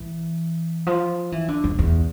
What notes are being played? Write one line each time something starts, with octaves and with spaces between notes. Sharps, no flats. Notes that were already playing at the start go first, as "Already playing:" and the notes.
Already playing: E3
F3
E3
D3
F2
E2